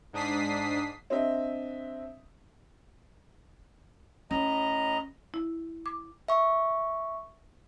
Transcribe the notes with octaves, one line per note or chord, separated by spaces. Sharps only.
G#2 D4 D#6 B6 C7
C4 D4 D#5 E5
A2 C#4 D#5 A#5
E4
D6
E5 C#6